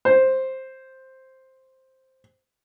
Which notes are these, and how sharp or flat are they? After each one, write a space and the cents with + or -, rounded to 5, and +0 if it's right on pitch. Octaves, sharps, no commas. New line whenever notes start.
C5 +5